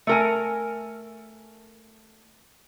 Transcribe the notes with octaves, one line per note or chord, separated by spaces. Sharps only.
A3 A#4 G#5